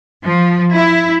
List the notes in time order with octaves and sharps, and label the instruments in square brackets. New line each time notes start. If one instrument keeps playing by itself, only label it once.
[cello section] F3
E4